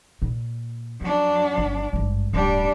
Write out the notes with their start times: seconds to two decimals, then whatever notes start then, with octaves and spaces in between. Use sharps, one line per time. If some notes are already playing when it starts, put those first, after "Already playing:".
0.22 A#2
1.01 F2 F#3 D4
1.58 G1
1.93 G#1 G2
2.33 D1 G3 D4